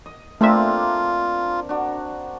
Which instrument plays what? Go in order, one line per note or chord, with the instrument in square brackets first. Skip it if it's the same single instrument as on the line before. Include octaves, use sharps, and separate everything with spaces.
[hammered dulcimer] D#5
[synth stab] A3 E5 [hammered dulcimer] A#3 C4 D4 [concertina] F4
[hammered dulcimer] D4 F#4